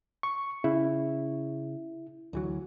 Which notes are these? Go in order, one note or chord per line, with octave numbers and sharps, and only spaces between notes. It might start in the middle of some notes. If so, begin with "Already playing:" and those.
C#6
C#3 E4
D2 E3 F#3